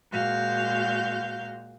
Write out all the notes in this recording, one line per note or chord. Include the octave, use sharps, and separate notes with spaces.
A#2 G#3 F#4 F5 G6